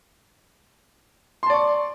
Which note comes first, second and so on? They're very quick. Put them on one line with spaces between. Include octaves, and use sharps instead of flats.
C6 A5 D5 C#6